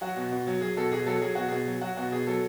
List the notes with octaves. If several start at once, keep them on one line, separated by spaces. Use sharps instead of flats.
F#3 F#4
B2
B2
F#3
F#3 G#4
B2 A4
B2 G#4
F#3 A4
F#3 G#4
B2 F#4
B2 G#4
F#3
F#3 F#4
B2 F#4
B2 G#4
F#3 A4